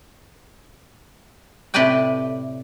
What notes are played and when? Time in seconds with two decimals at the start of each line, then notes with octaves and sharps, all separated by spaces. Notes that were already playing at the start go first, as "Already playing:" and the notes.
1.74 A2 C3 B4 D5 D#5 G5